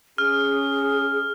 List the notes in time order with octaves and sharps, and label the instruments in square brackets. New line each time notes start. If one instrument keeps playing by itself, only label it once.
[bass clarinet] C#4 [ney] G#4 [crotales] F6